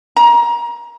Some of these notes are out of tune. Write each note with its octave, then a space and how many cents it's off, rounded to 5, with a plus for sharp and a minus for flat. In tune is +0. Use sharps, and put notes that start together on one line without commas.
A#5 +25